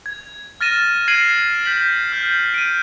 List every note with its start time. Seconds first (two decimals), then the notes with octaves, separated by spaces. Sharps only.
0.06 G#6
0.61 F6 A6 A#6 D#7 E7
1.08 G#6 C7 D7 D#7 F#7
1.65 G6 B6 F#7
2.12 F6 G6
2.54 D7 D#7